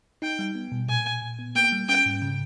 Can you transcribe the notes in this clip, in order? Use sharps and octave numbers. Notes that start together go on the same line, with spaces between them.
D#4 G5
G3
B3
B2
A#2 G#5
A#2
A#2
B3
A#3 G5
G3
C#4 G5
G#2
C#3